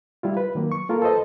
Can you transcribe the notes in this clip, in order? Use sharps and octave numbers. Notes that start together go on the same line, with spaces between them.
G3 E4 F4
B4
D#3 F#3 A#3
C#6
A#3 F4 A4 A#4
A4 B4 C5 D#5 A5